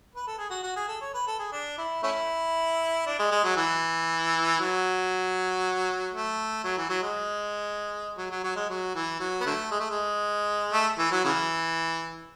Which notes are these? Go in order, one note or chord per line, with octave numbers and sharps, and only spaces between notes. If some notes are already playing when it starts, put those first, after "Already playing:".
B4
A4
G#4
F#4
F#4
G#4
A4
C#5
B4
A4
G#4
D4
E4
A3 C#4 E4
D4
G#3
G#3
F#3
E3
F#3
A3
F#3
E3
F#3
G#3
F#3
F#3
F#3
G#3
F#3
E3
F#3
B3
D3 F#3 A3
G#3
A3
G#3
A3
E3
F#3
C#3 E3